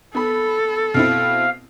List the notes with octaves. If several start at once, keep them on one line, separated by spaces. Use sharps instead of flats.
B3 A4 B5
B2 C4 E4 F5